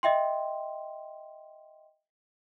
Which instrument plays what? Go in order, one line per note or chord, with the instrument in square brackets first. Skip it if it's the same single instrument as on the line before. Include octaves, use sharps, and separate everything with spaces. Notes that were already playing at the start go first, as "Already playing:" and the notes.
[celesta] D#5 E5 G5 C6